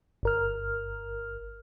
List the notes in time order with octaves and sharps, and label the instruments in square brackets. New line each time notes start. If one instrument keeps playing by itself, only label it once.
[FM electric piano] G1 A#4 F6